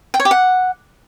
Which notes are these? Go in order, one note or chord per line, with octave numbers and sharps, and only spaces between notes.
G5
C#5
G4
F#5